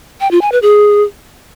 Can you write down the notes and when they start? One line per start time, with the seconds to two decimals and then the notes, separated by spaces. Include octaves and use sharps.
0.21 G5
0.31 F4
0.41 G#5
0.52 B4
0.62 G#4